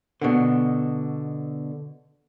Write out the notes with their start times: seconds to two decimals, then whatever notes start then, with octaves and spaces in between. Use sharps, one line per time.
0.21 B2 D3